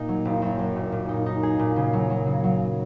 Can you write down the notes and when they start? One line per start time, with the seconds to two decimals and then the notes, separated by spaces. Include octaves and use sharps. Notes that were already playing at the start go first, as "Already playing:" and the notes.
Already playing: A#2 A#3 D#4
0.08 F#3
0.25 F#1
0.42 F#2
0.59 F#2
0.76 A#2
0.92 A#2
1.09 D#4
1.26 D#4
1.43 G#4
1.59 A#2
1.76 C#3
1.93 F#3
2.10 F#3
2.26 C#3
2.44 F#3